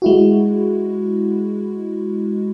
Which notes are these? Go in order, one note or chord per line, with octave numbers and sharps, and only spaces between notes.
G#3 E4 F#4